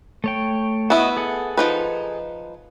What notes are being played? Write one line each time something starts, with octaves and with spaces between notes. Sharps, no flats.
A3 C#5 G5
B3 E4 F#4 D#5
G#4 A4 F#5
F3 D#4 B4